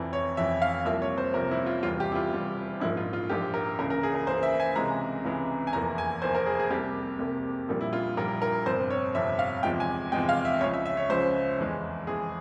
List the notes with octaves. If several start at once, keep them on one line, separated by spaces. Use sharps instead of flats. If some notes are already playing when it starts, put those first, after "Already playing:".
Already playing: F1 F2 E3
C#5
F1 F2 E3 E5
F5
C2 C3 F3 A#3 E5
C#5
C5
C2 C3 F3 A#3 A#4
E4
F4
E1 E2 C3 G3 F4
G4
E4
F4
E1 E2 C3 G3
A#1 G#2 F3 A#3 E4
F4
F4
A#1 G#2 F3 A#3 G4
A#4
C#2 C#3 E3 A#3 A#4
A#4
G#4
A#4
C#2 C#3 E3 A#3 C5
E5
G#5
C#2 C3 E3 G#3 A#5
C#2 C3 E3 G#3
G#5
F1 E2 E3 A#3 A#5
G#5
F1 E2 E3 A#3 C5
A#4
G#4
G#4
C2 C3 G3 A#3 G4
C2 C3 G3 A#3
A#1 A#2 G3 A#3
E4
F4
A#1 A#2 G3 A#3 A#4
A#4
G1 F2 C3 C5
C#5
G1 F2 C3 E5
F5
E2 C3 F3 G#3 G5
G#5
E2 C3 F3 G#3 G5
F5
E5
C#2 C#3 F3 G#3 C#5
E5
E5
C#5
C#2 C#3 F3 G#3 C5
F1 E2 E3 G#3
F1 E2 E3 G#3 G#4